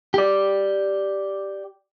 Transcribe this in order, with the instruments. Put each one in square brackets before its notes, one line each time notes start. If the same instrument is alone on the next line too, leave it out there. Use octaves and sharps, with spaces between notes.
[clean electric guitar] G4 D5